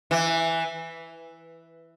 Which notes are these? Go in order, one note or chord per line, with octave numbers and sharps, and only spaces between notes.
E3